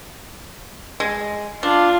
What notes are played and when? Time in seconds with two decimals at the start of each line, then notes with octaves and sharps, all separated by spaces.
1.00 G#3
1.63 D4 F4